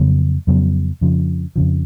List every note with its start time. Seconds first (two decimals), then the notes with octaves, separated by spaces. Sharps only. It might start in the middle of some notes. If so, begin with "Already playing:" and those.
Already playing: F2 C#3 F#3 B3
0.47 F2 C#3 F#3 B3
1.01 F2 C#3 F3
1.56 F2 C#3 F3